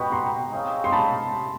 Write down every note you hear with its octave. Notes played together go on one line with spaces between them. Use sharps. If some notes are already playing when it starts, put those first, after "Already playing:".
Already playing: F#4 B4 D#5 G5 B5 C#6
A#5 C6
C4 D#4 G#4 C#5 F5
C6
A5 B5